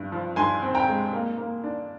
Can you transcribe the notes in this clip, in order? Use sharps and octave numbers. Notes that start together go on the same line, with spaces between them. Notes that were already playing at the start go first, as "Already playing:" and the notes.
Already playing: G2
F3
G2 G#5 C6
C4
G5 A#5
G#3
A#3
A#3
D4